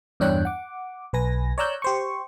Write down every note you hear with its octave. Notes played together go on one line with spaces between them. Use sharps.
E2 G2 D4 C#5 G5 F#6
F#5 D6
B1 B4 G#5 A#6
C#5 D5 A#5 E6 F#6 G6
G4 C5 C#6